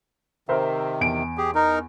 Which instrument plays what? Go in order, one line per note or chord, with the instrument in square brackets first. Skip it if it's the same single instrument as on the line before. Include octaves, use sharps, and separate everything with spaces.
[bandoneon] C3 D#3 [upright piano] A#4 C5 E5
[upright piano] E2 D7
[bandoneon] G4 G#4
D#4 A#4